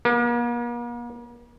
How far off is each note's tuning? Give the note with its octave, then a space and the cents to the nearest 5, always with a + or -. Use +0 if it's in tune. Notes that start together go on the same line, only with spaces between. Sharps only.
A#3 +45